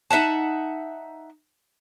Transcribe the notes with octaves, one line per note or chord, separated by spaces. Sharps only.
D#4 E5 F#5 A5